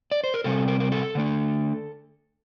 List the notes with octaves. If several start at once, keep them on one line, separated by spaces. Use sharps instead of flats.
D5
C5
A#4
C3 G3 C4 A4
A#4
A#4
A4
D3 A3 D4